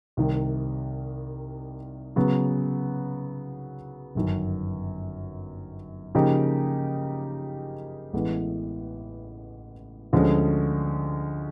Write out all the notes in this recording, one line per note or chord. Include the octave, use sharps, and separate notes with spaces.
C2 C3 D#3
C#3 F#3 B3
G1 F#2 D#3
C#3 F3 A#3 D#4 G4
A1 A2 E3 G#3 B3
D2 D3 F3 G#3 C#4